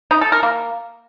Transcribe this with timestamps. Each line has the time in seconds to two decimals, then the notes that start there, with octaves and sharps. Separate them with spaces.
0.11 D#4
0.21 A4
0.32 A#4
0.43 A#3